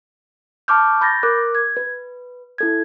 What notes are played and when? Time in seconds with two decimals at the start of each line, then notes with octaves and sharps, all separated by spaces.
0.68 A5 C#6 D6 F6 G6
1.01 B5 G6 A6 A#6
1.23 A#4 D6 F#6
1.55 G#6
1.77 B4
2.58 E4 A4 G#6